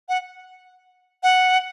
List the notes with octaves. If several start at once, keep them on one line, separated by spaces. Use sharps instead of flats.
F#5
F#5